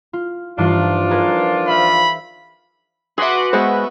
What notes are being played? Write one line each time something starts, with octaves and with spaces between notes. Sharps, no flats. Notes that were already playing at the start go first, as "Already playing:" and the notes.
F4
G2 E3 F3 D4 D#4 F4
G#4 A#4 B4
C5 E5 F5 B5
F#4 G#4 B4 E5 F#5 C6 D6
G#3 B3 C5 E5